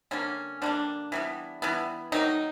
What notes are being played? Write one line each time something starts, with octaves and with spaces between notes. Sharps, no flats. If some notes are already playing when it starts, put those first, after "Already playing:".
D3 G3 A#3 C#4
D3 G3 A#3 D4
E3 G3 B3
E3 G3 B3
D#3 F#3 A#3 D#4